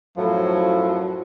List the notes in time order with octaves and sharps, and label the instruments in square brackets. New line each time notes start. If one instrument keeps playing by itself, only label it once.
[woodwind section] F#2 A2 F3 [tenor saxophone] F#3